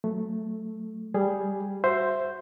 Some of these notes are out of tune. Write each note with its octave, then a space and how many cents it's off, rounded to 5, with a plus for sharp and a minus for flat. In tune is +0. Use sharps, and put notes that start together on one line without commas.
F#3 +0 A3 +0
G3 +5 G#4 +0
F#4 +0 C5 +0 E5 +10